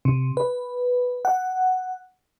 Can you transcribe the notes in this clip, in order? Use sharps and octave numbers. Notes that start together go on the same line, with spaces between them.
C3
B4
F#5